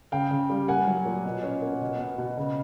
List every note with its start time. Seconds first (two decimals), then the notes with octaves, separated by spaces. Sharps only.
0.12 C#3 F5 G5
0.31 C#3
0.50 G3
0.68 A#3 F#5 G#5
0.87 F#3
1.05 A#2
1.25 B2
1.43 C#4
1.62 A#3
1.81 B2
1.99 B2
2.18 B2
2.37 C#3